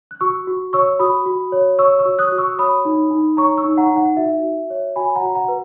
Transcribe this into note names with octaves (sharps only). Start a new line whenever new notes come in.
F#6
F#4 C#6 E6
F#4
C#5 C#6 E6
F#4 B5 D#6
F#4
C#5
C#5 C#6 E6
C#6 E6
F#4
D#6 F#6
F#4
C#6 E6
C#5 B5 D#6
D#4
D#4
C#5 A#5 C#6
C#6 E6
D#4
F#5 A#5
D#4
F#5
F#4 E5
F#4
C#5
F#4 G#5 B5
F#5 A#5
F#4
F#5 A#5
B4